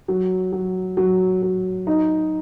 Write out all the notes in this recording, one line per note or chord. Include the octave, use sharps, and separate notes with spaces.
F#3
F#3
F#3
F#3
D#4